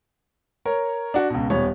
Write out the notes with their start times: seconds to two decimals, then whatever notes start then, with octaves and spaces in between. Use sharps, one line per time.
0.65 A#4 C#5
1.14 D4 F#4
1.30 C#2 B2
1.50 D#1 B3 C#5